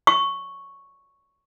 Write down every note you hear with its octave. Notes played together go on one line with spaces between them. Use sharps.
C#6